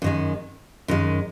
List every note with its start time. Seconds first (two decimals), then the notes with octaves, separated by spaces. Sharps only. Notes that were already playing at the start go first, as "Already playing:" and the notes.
0.02 F#2 D#3 G#3
0.88 F#2 D#3 G#3